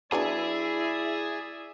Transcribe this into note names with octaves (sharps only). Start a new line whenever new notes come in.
F#3 B3 D4 E4 G#4 D5 E5